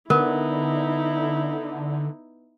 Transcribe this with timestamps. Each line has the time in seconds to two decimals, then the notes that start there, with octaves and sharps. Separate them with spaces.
0.10 D3 B3 D#4 E4 A#4